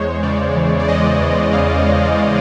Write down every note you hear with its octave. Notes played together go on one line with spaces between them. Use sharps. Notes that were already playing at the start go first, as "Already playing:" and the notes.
Already playing: E2 G#3 C5 C#5
C#3 D5
E3
D5
G#3 D#5
E2
C#3 F5
E3